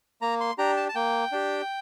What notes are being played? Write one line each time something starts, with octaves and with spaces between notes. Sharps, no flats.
A#3 A#5
C6
D4 G4 A#5
A5
A5
A#3 G5
D4 G4